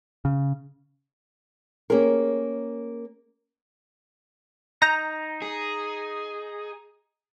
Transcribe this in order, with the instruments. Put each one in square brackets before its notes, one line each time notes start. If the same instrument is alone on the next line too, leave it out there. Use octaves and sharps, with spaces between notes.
[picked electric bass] C#3
[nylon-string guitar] A#3 C#4 G4 G#4 A#4
[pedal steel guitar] D#4 G6 [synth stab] A#5
[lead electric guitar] G#4